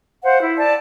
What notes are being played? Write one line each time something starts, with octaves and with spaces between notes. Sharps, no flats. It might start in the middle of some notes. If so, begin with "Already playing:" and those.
C5 F5 F#5
E4
D5 A5